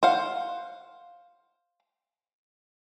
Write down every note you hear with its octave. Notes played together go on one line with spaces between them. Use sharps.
C5 F5 F#5